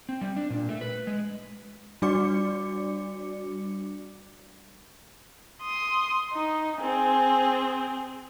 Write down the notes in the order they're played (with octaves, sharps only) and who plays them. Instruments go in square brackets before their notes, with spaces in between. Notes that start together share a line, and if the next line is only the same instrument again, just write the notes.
[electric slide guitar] C4
G3
D4
A#2
A3
B4
G#3
[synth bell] G3 D4 F#4 D5 D6 C#7
[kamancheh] C6 D#6
D#4
C4 G#4